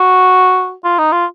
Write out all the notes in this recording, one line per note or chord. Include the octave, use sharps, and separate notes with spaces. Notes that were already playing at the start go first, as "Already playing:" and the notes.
Already playing: F#4
F4
D#4
F4